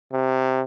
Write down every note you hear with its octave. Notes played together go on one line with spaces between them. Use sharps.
C3